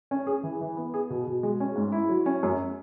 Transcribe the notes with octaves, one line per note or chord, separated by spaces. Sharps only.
C#4
G#4
E3
E3
B3
G#4
B2
B2
G#3
C#4
G#2
E4
F#3
C#4
F#2